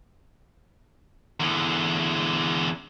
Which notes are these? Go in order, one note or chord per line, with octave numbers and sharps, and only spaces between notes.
E2 D3